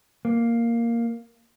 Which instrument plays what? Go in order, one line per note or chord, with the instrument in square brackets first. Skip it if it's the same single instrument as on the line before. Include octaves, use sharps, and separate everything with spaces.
[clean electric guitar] A#3